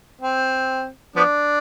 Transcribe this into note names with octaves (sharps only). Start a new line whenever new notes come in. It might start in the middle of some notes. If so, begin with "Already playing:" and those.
C4
F3 B3 D4